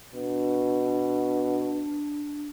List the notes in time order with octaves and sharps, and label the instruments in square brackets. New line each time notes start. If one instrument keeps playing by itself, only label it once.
[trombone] B2 [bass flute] D4